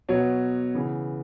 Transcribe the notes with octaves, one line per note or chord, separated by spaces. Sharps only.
B2 F#3 B3 C#5
C#3 E3 B3